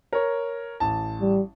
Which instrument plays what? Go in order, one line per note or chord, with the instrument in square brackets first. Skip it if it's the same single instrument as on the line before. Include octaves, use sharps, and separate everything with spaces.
[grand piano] A#4 C#5
A1 A5
[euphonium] G3